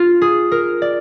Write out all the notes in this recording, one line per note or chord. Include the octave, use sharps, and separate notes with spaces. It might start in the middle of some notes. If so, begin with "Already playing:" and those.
Already playing: F4
G#4
A#4
D5